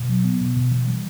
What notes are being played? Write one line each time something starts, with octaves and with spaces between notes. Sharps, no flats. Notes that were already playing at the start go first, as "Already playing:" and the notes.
Already playing: B2
F#3
B3
B2
B2
E3
G3